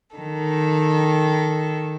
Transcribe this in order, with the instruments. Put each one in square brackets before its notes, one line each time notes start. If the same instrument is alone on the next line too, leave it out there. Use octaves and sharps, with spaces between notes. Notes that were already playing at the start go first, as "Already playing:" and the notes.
[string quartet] D#3 A4